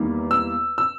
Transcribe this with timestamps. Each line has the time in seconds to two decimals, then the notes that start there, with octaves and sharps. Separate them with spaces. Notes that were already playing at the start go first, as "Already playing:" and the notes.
Already playing: E2 D#3 G3 A#3
0.31 E6
0.78 E6